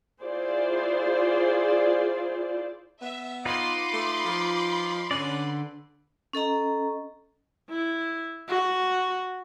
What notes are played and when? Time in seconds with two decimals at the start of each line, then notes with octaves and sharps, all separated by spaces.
0.22 E4 F4 G#4 C5 D5
3.02 B3 E5
3.45 D#4 F4 B4 B5 C6 D6
3.93 A3
4.25 F3
5.11 D3 C#4 B4 D5
6.33 C#4 A4 D#5 A#5
7.70 E4
8.48 F#4